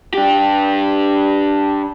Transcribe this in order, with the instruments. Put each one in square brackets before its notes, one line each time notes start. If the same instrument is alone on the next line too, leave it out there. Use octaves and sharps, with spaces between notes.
[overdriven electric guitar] D4 G4